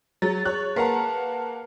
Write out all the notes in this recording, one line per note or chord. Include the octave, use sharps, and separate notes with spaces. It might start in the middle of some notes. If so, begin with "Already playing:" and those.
F#3 G#4 A6
C#5 F#6
A#3 A#4 B4 F#5 A5 A#5